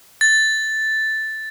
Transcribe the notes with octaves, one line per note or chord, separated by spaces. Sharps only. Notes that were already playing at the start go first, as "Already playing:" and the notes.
A6